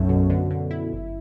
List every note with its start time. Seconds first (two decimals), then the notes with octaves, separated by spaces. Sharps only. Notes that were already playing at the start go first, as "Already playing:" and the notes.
Already playing: B1 F#2 A3
0.09 B2
0.30 D3
0.51 D3
0.71 E4
0.93 G1